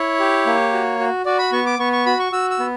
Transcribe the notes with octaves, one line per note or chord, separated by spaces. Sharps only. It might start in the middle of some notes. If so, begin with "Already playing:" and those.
Already playing: E4 C#5
G4
A#3
F#4
F#4
F#4 D5
B5
B3 C#6
D6
B3 C#6
C#6
F#4 B5
C#6
F#4 E6
E6
B3